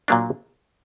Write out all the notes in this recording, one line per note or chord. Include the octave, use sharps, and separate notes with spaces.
A#2 F#3 A#3 D4